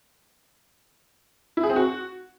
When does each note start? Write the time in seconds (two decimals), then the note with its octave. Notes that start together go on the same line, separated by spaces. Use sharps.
1.57 E4
1.63 G#4
1.70 C4
1.76 F#4